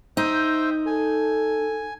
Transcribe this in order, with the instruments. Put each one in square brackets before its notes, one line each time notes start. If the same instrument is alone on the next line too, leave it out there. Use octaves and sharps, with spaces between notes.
[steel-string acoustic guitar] D#4 [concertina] C5 E5 G5
[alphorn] A4 [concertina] G#5